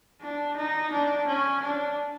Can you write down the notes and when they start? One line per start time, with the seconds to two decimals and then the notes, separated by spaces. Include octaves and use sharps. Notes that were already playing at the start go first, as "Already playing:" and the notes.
0.21 D4
0.57 D#4
0.92 D4
1.27 C#4
1.63 D4